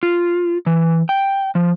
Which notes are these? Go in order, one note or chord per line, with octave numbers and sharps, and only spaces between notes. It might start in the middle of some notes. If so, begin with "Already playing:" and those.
F4
E3
G5
F3